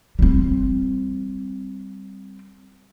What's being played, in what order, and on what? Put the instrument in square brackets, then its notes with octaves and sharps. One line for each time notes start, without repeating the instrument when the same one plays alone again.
[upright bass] G3 C4